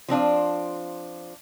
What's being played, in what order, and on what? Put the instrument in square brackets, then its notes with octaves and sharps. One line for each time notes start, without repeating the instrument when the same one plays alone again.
[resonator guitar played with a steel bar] F3 C4 D4 F4